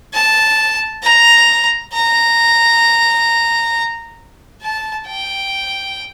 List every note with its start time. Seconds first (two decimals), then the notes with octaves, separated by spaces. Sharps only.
0.14 A5
1.03 A#5
1.93 A#5
4.62 A5
5.07 G5